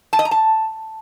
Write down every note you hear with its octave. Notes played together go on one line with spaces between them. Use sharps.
A5
D#5
A#5
A5